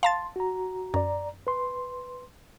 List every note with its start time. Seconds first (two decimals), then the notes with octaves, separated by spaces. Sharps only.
0.03 F5 A5 C6 A6
0.36 F#4 A#5
0.94 F#2 D5 A#5
1.47 B4 C6